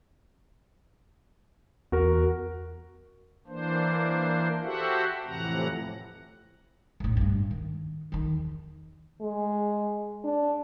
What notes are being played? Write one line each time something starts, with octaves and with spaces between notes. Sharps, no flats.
E2 F#4 A#4
E3 A#3 D4 C5
F#4 G4 A4 C5 E5 F#5
F2 A2 C3 E3 F#5 A#5
B1 A2
G2 D4
D#3
E2 D#3
G#3
D4